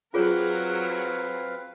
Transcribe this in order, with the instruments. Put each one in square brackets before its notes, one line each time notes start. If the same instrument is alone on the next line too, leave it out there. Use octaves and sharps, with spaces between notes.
[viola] F#3 A#4 [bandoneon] C4 B4 F5 [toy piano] F4 G#4 C#5